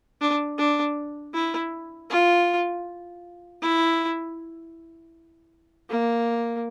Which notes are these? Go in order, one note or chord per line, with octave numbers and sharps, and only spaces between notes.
D4
D4
E4
F4
E4
A#3